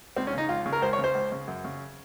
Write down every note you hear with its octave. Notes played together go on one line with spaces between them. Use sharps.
C#2 C4
C#4
C#3 D#4
C#2 F4
C#3
A#4
C#2 C5
C#5
C#3
C5
C#2
C#3
F#2
C#3